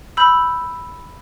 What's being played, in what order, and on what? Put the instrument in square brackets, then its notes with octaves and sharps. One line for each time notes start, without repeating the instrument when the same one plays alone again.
[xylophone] B5 E6 G6